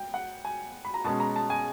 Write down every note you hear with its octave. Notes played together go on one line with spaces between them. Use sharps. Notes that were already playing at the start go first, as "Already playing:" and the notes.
Already playing: G5
F#5
G#5
B5
A#5
B2 G#3 C#4 A5
A#5
A5
G#5